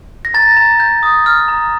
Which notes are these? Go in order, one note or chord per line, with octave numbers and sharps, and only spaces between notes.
A#6
A#5 A6
A#5
G6
D#6
F6
A#5